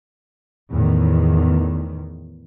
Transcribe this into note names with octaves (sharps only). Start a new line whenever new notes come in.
E2 A2 D#3